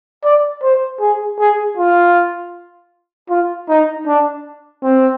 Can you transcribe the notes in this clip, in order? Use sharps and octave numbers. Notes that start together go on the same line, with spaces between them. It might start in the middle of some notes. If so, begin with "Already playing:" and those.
D5
C5
G#4
G#4
F4
F4
D#4
D4
C4